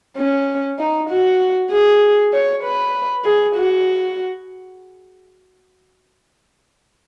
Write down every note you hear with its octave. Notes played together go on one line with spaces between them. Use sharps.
C#4
D#4
F#4
G#4
C#5
B4
G#4
F#4